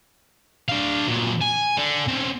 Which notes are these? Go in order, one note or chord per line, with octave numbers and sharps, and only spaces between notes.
D4 F5
A#2 F#3
G#5
D3
C4 C#4